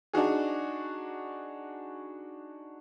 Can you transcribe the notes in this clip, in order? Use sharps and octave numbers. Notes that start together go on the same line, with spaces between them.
D4 D#4 F#4 G#4